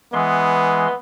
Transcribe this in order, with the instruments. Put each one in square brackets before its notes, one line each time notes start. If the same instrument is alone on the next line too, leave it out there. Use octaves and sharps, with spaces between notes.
[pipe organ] E3 G#3 C6 [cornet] B3